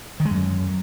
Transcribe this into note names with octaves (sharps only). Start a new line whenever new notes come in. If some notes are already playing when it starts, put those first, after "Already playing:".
D#3
G#3
F#2